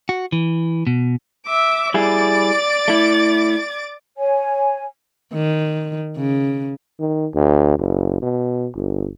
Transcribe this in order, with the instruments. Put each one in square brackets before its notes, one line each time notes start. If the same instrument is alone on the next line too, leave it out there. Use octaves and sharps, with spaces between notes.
[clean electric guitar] F#4
E3
B2
[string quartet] E5 D6
[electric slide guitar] G3 E4 G#4 [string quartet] D5 D6 A6
[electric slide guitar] A3 E4
[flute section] C#5 G#5
[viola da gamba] D#3
C#3
[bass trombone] D#3
D2
F#1
B2
G1